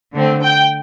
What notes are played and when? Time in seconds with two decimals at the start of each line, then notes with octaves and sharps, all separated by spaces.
0.14 D3 A3 C4
0.42 G5